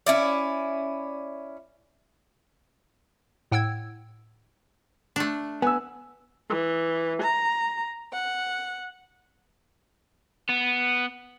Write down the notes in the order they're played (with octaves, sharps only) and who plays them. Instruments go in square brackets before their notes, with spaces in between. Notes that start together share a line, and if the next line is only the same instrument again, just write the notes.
[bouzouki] C#4 E4 D5
[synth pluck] A2 F#5 G5 E6 G#6
[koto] A3 D4
[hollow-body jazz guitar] B3 [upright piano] G#5 E6
[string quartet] E3
A#5
F#5
[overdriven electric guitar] B3